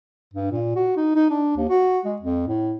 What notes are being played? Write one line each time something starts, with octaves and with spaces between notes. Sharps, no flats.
G2
A#2
F#4
D#4
D#4
D4
D#2
F#4
G#3
F2
A2